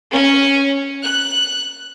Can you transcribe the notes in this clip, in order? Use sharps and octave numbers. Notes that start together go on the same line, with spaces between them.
C#4
F#6